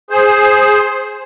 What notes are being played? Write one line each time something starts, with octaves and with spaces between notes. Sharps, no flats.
G#4 C5